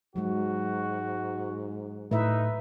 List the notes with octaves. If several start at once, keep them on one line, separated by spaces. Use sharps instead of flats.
G#2 F#3 G#3 F#4
A2 D#4 B4 E5